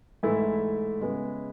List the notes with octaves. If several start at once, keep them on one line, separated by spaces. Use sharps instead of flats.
G#2 E3 A3 E4
C#3 G#3 B3